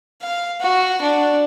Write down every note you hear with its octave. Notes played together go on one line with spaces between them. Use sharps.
F5
F#4
D4